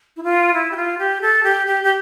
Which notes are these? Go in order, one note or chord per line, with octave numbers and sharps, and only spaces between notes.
E4
F4
E4
G4
F4
G4
A4
G4
G4
G4